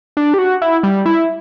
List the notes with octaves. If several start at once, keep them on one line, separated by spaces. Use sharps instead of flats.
D4
G4
F#4
E4
G3
E4